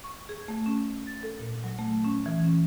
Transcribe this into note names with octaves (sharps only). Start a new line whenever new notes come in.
C#6
G#4
A3
C#4
A6
A4
A#2
F#3
A3
C#4
E3
C#4